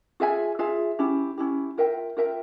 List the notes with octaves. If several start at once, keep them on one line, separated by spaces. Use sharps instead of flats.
F4 G#4 E5 G#5
F4 G#4 E5 G#5
C#4 E4 G4
C#4 E4 G4
F4 A#4 E5 G5
F4 A#4 E5 G5